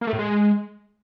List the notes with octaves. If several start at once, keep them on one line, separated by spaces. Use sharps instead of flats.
A#3
A3
A2
G#3